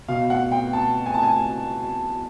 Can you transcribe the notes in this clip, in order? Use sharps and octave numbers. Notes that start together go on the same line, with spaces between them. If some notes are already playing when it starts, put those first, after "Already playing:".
B2 F5
F#5
G5
A5
G#5
A5
G#5